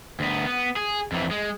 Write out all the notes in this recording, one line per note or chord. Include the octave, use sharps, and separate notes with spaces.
D2 B3
B3
G#4
F2 E3
G#3